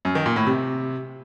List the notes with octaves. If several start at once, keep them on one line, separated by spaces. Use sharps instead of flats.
F#2
D#3
A#2
A2
C3